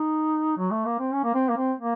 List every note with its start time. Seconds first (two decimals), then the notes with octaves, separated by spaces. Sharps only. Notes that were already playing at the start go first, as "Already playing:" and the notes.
Already playing: D#4
0.57 F#3
0.71 A3
0.85 A#3
0.99 C4
1.13 C#4
1.24 A#3
1.35 C4
1.49 A#3
1.57 C4
1.80 A#3